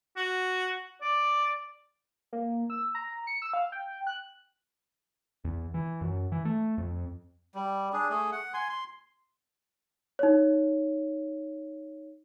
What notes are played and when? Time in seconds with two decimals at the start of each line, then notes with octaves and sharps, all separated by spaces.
0.17 F#4
1.01 D5
2.33 A#3
2.70 E6
2.95 A#5
3.27 C#7
3.42 E6
3.53 F5
3.72 G5
4.07 F#6
5.45 E2
5.74 E3
6.01 F#2
6.32 E3
6.45 A3
6.78 F2
7.55 G3
7.93 D4 G#4
8.10 A3 G#4
8.32 F#5
8.54 G#5 C6
8.69 C6
10.19 D#4 C#5